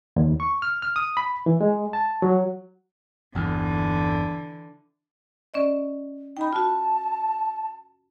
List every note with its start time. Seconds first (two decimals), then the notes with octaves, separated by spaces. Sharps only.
0.16 D#2
0.40 C#6
0.62 F6
0.82 F6
0.96 D#6
1.17 B5
1.46 E3
1.61 G#3
1.93 A5
2.22 F#3
3.35 G1 E2 D3 E3
5.54 C#4 D5 D#5
6.37 D#4 G5 B5
6.53 F4 F#4 A5